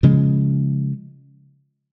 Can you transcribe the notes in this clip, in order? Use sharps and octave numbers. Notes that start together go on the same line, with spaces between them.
C#3 F3 G#3